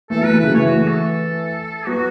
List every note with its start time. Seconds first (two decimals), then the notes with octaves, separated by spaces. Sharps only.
0.10 E3 A3 A4
0.21 F#3 B3
0.25 B4
0.32 E3 A3
0.40 C#3 F#3 B4
0.54 E3 A3 C#5
0.66 F#4
0.77 F#4
0.88 A4
1.87 F#3 B3 F#4